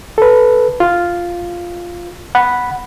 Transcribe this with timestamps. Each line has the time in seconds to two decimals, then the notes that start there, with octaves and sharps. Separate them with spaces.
0.18 A4 B4
0.80 F4
2.35 F#5 B5